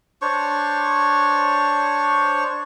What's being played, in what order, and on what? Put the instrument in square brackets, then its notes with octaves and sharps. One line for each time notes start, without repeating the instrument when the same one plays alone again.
[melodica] D4 C5 C#5 C#6